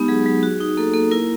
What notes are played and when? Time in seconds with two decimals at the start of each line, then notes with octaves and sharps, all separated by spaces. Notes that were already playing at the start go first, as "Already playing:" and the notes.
Already playing: G#3 B3 D#4 G4
0.08 F#3 G#4
0.26 F#3
0.43 F#4
0.61 D#4
0.77 A#3 A4
0.94 A#3 A4
1.11 E4 A#4